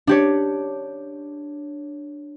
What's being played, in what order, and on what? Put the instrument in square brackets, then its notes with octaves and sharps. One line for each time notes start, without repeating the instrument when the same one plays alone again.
[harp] D4 G4 C#5